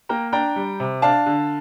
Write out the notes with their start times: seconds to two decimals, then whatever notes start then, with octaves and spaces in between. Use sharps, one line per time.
0.09 A#3 G5 A#5
0.33 D4 G5 A#5
0.56 G3
0.80 C3
1.02 D4 F5 A5
1.26 D3